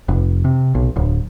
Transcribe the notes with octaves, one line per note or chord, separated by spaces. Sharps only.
F1
C3
B1
D1